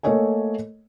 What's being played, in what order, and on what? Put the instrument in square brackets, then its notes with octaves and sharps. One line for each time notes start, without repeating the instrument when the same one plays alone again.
[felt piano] A3 A#3 A4 C#5 D#5 G#5